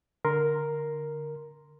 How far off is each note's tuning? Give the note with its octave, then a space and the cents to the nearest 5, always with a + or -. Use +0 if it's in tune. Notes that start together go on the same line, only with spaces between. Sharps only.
D3 +0 A#4 +0 C6 +0